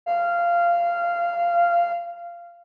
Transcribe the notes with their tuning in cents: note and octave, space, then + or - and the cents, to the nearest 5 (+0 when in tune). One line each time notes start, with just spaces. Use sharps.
F5 -15